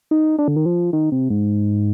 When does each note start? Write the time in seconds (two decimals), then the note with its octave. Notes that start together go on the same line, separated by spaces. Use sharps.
0.11 D#4
0.39 D4
0.48 D3
0.56 D#3
0.66 F3
0.93 D#3
1.12 C3
1.30 G#2